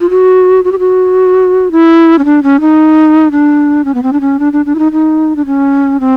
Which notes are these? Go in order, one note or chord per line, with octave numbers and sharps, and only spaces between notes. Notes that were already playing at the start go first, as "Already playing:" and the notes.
F4
F#4
F#4
G4
F#4
E4
C#4
D4
C#4
D#4
D4
C#4
B3
C4
D4
C#4
D4
D4
D4
E4
D#4
D#4
D4
C#4
C4